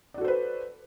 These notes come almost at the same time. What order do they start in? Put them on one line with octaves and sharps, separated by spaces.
D5 F#4 A4 C5 B4